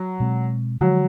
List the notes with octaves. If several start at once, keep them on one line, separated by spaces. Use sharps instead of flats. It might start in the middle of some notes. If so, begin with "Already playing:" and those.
Already playing: F#3
B2 G#3 C4
D3 F3 F#3 G#3